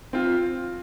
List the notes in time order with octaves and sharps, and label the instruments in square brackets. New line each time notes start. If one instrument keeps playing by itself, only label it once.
[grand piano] C4 F4